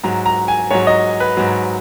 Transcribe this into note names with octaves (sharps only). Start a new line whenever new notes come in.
G#2 F#3 A#5
A#5
G#5
G#2 F#3 C#5
D#5
B4
G#2 F#3